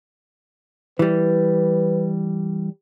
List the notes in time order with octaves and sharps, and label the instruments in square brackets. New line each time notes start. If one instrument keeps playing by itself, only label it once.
[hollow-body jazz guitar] E3 G3 [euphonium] B4